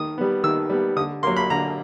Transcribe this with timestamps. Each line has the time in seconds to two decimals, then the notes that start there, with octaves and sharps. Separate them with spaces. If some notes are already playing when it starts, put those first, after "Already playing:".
Already playing: D#3 D#6
0.18 G3 B3
0.43 D#3 E6
0.70 G3 B3
0.96 D3 D#6
1.23 F#3 A#3 C6
1.36 B5
1.50 D3 A#5